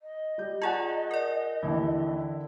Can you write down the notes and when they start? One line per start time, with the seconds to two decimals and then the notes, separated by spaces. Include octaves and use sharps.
0.02 D#5
0.38 G3 G6
0.62 F4 G#4 D5 F#5 G#5 A5
1.11 A#4 D5
1.63 D#2 D3 E3 E4